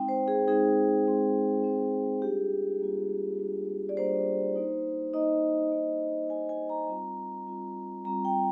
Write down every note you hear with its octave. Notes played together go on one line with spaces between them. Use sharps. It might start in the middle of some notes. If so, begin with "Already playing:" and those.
Already playing: G#3 C4 D#4 G5
C5
G#4
G#3 C4 D#4 G#4
G#3 C4 D#4
G#3 C4 D#4
G3 A#3 D4 F4 G4
G3 A#3 D4 F4
G3 A#3 D4 F4
D5
G3 A#3 D4 F4 C5
A#3 D#4
A#3 D#4 D#5
A#3 D#4
A#3 D#4 G#5
G#5
A#5
G3 C4 F4
G3 C4 F4
G3 C4 F4 A#5
G5